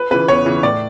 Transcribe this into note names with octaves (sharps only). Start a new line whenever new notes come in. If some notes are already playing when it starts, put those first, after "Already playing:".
Already playing: B4
C#3 E3 B4
E2 C#5
C#3 E3
A2 D5